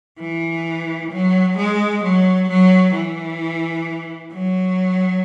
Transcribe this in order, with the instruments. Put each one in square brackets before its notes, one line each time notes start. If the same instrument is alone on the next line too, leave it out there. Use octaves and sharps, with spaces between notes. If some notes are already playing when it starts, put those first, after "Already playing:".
[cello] E3
F#3
G#3
F#3
F#3
E3
F#3